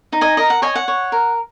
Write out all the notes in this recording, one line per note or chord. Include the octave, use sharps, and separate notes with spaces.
D#4
D#5 G#5
A#4 D#5
F#5
C#5 D#5 G#5
F#5
C#5
A#4